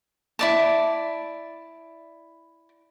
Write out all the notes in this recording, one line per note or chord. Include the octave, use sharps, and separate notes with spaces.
E4 D5 A5